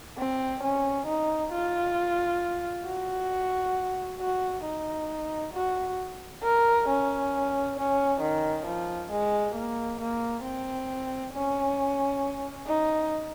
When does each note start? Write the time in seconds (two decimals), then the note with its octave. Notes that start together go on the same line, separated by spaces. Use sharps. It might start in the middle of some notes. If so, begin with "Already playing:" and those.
0.18 C4
0.63 C#4
1.07 D#4
1.52 F4
2.85 F#4
4.20 F#4
4.64 D#4
5.53 F#4
6.43 A#4
6.88 C#4
7.77 C#4
8.21 D#3
8.66 F3
9.10 G#3
9.54 A#3
10.00 A#3
10.43 C4
11.33 C#4
12.67 D#4